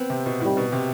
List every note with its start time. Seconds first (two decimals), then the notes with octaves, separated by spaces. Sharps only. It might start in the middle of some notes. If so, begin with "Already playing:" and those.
Already playing: B3 C4
0.10 C3
0.26 B2
0.40 A2 C3 D#3 G3
0.57 B2
0.72 C3